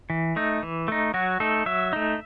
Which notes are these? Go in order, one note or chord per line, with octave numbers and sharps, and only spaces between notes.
E3
A3 D#4
E3
A3 D#4
F#3 F#4
A3 D#4 A4
F#3 E5
A3 D#4